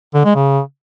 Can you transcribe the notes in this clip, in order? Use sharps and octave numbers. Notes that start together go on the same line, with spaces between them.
D3
G#3
C#3